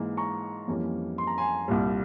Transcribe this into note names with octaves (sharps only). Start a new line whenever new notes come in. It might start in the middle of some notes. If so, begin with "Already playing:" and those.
Already playing: G#2 E3 A#3
A#5 C#6
F2 E3 G3 A#3 C#4
C6
A#5
G#5 C6
C2 A#2 G3